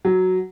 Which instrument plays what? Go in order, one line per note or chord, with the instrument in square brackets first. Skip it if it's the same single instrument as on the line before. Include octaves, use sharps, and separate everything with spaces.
[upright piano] F#3